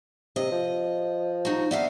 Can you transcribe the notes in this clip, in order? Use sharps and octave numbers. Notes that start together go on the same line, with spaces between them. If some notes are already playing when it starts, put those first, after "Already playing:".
C3 D#5
F3
D#4 F#4
B3 D4 E5 F5